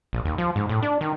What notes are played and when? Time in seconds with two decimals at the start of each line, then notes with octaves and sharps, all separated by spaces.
0.13 A#1
0.25 D#2
0.38 F3
0.56 G#2
0.69 A2
0.82 D4
1.01 D#3